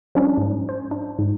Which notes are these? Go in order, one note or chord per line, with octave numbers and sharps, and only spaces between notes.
F3 G3 C#4 D4
G#2
C5
D4
G#2